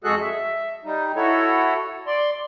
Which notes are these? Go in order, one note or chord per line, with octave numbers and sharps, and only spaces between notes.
F2 G#3 F#4 G#4 A4 F#6
E5
G3 D#4
E4 F#4 A4 C#5
D5 C6